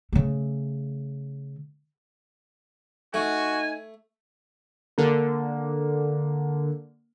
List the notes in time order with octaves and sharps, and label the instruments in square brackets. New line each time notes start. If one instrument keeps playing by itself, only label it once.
[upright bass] C#3 A3
[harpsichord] A3 [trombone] D#4 [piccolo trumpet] F#4 [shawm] G#5
[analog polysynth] D3 [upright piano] A#3